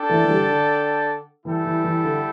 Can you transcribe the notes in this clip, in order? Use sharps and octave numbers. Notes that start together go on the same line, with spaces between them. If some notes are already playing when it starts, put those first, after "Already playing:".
Already playing: D4 A4 D5 G5
E3 A3
E3
D3 G3
D3
E3 G3 E4 A4 G5
E3
E3
D3